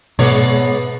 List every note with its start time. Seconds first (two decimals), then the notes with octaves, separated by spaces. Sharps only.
0.19 G#2 B2 G#3 B3 C#5 D5